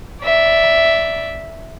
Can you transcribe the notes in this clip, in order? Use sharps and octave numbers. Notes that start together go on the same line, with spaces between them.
D5 E5